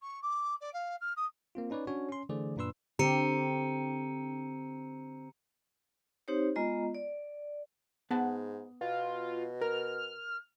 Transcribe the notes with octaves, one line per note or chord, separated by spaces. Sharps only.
C#6
D6
D5
F5
F6
D#6
A#3 C4 F4
C#4 D#4 B4 C#5 D5
C#4 D4 F#4 C#5
C#4 C6
D3 E3 A3 G#4 C5 D5
F#2 A#2 D4 B4 C6 E6
D3 C4 G4 A#5 C#7 D#7
C4 D#4 G4 C5 C#5
G#3 B3 F4 D#5 A#5
D5
G#2 B3 F#5 A5
B2 F4
A#4 F6